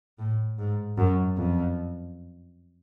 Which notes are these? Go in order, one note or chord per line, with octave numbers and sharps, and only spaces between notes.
A2
G#2
F#2
F2